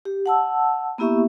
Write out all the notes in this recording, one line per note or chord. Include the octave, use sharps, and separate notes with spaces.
G4
F#5 A5 E6
A#3 B3 E4 G4 E5 C#6